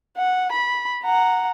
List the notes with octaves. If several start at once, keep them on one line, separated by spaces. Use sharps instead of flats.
F#5
B5
F#5 A#5